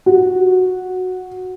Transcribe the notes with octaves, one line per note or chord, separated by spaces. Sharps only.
F#4